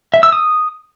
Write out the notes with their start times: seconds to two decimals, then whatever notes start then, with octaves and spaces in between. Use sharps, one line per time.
0.14 E5
0.23 E6
0.32 D#6